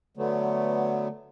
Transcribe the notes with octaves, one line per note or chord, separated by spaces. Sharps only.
D3 F#3 A3 B3